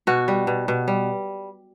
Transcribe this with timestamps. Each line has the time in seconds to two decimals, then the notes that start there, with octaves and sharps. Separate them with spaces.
0.07 B2 F#4
0.28 G3
0.47 B2
0.68 B2
0.88 G3